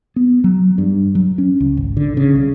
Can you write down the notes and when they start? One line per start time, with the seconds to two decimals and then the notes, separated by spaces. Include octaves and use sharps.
0.16 B3
0.44 F#3
0.78 G2
1.15 F#3
1.38 C#4
1.60 C#2
1.77 G#1
1.97 D3
2.17 C#3
2.35 C2